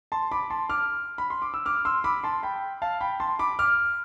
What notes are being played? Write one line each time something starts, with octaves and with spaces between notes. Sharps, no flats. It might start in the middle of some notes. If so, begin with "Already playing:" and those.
A5 C6
B5 D6
A5 C6
D6 F6
B5
C6
D6
E6
D6 F6
C6 E6
B5 D6
A5 C6
G5 B5
F5 A5
G5 B5
A5 C6
B5 D6
D6 F6